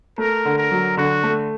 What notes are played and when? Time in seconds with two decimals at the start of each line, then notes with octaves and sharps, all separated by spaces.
0.18 A3 A#4
0.45 D3
0.58 A#4
0.71 F#3
0.97 D3 F#4
1.23 A3